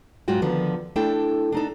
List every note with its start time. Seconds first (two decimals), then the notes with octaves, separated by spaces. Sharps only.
0.28 G#2 F#3 G#3 F4 F#4 G5
0.42 D3 D#3 F3 B3
0.96 A3 D4 E4 A4 G5
1.52 D4 D#4 A4